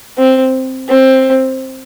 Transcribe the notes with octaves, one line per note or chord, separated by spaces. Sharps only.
C4
C4